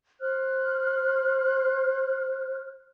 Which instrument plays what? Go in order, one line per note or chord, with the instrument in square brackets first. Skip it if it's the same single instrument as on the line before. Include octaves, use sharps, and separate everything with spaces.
[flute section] C5 F6 F#6